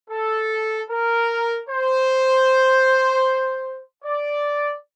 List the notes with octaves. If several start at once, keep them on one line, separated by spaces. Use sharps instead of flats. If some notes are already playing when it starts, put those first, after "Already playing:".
A4
A#4
C5
D5